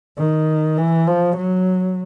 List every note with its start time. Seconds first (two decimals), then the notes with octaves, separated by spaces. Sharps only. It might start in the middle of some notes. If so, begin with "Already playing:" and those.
0.18 D#3
0.78 E3
1.08 F3
1.37 F#3